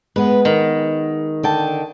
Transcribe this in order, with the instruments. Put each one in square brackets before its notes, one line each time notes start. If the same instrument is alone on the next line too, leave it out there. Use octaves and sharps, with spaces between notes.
[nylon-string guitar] G#3 B3 [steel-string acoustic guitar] B4
[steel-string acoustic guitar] D#3
[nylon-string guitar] D3 G5 A5